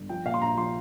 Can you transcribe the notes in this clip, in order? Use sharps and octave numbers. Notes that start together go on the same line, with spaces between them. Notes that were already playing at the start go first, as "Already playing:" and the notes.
Already playing: G1
F3 G5
A#2 F5
C6
A#1 A#5
F3 C6